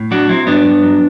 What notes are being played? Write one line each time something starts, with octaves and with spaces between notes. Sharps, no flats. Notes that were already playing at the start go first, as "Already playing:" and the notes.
Already playing: A2
F#3 D4 F#4
F#3 C4 E4
G2 B3 D4
G2
F#3